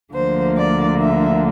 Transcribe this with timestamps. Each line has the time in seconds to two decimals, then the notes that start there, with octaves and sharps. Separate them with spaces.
0.13 D2 D3 F3 A#3 C5
0.56 D5
1.00 E5